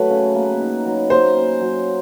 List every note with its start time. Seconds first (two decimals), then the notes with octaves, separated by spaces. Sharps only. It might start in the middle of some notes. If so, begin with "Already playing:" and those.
Already playing: F#3 A3 B4
0.10 C#3
0.35 A#3
0.60 D#4
0.86 F#3
1.10 A#3 C5
1.36 C#4
1.61 F#3